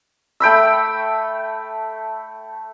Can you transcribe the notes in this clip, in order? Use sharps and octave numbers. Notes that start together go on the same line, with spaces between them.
A3 G5 B5 E6